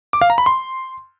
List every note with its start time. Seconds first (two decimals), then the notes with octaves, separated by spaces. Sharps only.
0.13 D6
0.21 F5
0.30 A#5
0.38 B5
0.46 C6